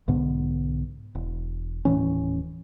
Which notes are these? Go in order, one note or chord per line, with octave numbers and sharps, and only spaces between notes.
B1 G#2 D3 B3
E1
D#1 A2 E3 C#4